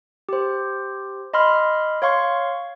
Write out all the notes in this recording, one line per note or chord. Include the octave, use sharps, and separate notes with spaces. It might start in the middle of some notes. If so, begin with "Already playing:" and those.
G4 C5
D#5 B5 C6 F6
C#5 F5 C6 C#6